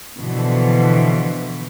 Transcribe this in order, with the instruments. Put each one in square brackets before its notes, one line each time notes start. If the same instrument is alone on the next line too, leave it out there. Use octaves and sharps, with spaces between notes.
[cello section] B2 D3 E3 F3